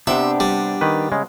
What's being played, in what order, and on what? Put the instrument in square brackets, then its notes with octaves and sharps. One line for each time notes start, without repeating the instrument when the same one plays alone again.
[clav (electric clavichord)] C3 [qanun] B3 C4 G4 [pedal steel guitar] D4 [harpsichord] E5
[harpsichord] G3
[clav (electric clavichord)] D#3 B4
C#3 G#3